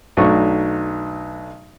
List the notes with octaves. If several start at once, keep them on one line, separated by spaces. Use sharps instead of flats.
B1 F#3 A3 D4 C#6